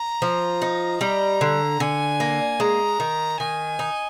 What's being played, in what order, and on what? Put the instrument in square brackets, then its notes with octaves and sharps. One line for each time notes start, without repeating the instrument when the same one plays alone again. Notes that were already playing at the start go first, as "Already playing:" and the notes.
Already playing: [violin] A#5
[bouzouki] F3
D#4
[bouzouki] G3 [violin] A#5
[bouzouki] D3
[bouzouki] D3 [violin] G#5
[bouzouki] A#3
[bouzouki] G#3 [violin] A#5
[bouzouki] D#3
[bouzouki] D#3 [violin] G#5
[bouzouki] D#4